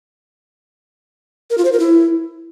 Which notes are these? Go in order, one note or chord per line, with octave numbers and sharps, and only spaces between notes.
A#4
F4
C5
A#4
E4